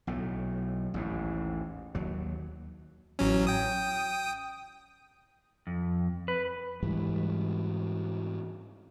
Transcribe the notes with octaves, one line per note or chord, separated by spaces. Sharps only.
B1 A2
A1 D#2 G#2
D#2 F#3
A1 F#3 C#4
G5 D#6
F2
B4
G#2 E3 G3